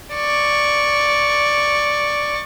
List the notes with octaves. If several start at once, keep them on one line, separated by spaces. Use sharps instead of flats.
D5 C#6